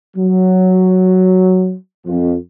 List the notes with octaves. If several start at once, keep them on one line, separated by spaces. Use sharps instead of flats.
F#3
F2